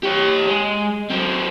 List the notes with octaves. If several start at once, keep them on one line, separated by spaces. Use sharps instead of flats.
G4 C#5
G#3
F#3 C4